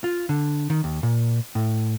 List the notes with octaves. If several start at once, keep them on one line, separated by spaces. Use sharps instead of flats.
F4
D3
D#3
D#2
A#2
A2